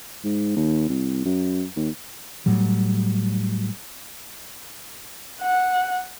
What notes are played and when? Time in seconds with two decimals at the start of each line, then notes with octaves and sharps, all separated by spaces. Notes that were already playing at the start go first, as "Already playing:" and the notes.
0.24 G#2
0.56 D#2
0.89 C2
1.25 F#2
1.77 D#2
2.46 A2 F#3 G3
5.42 F#5